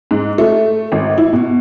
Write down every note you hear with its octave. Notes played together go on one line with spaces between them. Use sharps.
G#2
A3
G#1
E4
B2